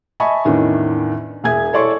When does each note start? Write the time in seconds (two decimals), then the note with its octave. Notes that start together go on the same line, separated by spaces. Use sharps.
0.20 D#5 E5 G#5 A5 B5 C#6
0.45 E2 A2 D#3 C#4 D4
1.44 E1 G#4 E5 G#5 G#6
1.73 E4 A4 C#5 D5 C6 C#6